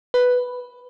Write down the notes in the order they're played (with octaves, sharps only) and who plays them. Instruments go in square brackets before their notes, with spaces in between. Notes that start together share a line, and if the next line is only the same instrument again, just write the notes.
[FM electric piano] B4